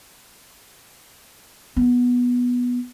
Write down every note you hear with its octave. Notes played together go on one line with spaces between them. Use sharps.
B3